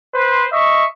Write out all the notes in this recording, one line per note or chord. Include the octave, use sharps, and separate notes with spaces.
B4 C5
D#5 E5 C#6